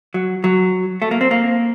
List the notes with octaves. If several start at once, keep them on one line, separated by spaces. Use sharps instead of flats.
F#3
F#3
A3
A#3
C4
A#3